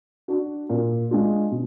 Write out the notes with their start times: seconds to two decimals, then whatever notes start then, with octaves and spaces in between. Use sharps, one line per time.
0.28 D4 F#4
0.70 A#2
1.11 G#3 D4 F4
1.51 B2